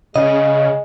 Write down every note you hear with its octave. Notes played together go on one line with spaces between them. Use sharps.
C#3 G#3 D#5